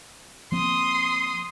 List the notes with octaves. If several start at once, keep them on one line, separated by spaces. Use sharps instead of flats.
F3 A#3 C4 C6 D#6